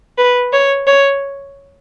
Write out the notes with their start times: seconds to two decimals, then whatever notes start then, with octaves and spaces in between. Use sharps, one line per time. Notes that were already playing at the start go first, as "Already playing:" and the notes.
0.18 B4
0.53 C#5
0.87 C#5